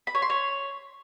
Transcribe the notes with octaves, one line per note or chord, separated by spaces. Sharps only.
B5
C#5
C6
C#5